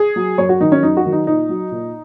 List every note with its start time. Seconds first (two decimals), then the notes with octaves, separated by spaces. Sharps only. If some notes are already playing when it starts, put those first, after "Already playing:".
Already playing: G#4
0.16 F#3
0.38 F#2 C#5
0.49 F#4
0.60 D#3 F#3 D#4
0.72 C#4
0.83 F#2 D#4
0.97 F#4
1.05 D#3 F#3
1.12 D#4
1.27 A#2 D#4
1.49 F#3
1.71 A#2